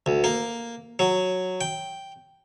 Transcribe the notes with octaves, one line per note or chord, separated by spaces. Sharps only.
D2
A#3
F#3
G5